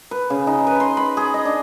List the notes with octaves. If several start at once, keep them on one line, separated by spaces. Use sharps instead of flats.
B4
C#3
D#4
B4
C6
B5
G#4
D#5
D4